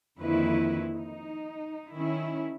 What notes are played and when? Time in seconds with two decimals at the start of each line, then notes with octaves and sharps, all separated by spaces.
0.19 F2 D3 D#3 A#3 E4 B4
0.92 D#4
1.92 D#3 C#4 E4